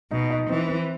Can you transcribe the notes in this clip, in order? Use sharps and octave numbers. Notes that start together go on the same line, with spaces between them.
B2 D#4
D#4
E3 C4
C4